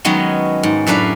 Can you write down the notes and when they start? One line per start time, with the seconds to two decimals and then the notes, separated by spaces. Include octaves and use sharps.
0.05 D#3 F#3 G#3 B3 C#4
0.63 G#2
0.87 F#2 A2 D4 B4 F5